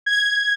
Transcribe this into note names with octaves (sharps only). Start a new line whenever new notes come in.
G#6